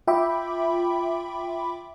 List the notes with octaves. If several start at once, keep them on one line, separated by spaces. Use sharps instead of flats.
F4 E5 G5 B5 D6